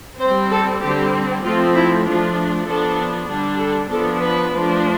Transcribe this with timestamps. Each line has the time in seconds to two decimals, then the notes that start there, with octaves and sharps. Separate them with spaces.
0.20 G3 C4 C5
0.51 A4
0.82 D3 G3 C4 G4
1.43 F3 A3 C4 F4
1.75 E4
2.05 F3 A3 D4 F4
2.67 F3 B3 D4 A4
3.28 D3 G3 D4
3.59 A4
3.90 F3 B3 D4 A4
4.21 B4
4.52 F3 A3 D4